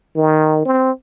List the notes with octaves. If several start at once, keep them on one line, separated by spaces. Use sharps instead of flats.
D#3
C4